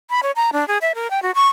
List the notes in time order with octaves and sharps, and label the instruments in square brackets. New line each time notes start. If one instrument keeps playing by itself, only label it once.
[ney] B5
C#5
A#5
D4
G#4
E5
A#4
G5
F#4
C#6